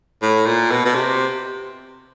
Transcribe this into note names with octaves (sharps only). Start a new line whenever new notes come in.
A2
A#2
B2
B2
C3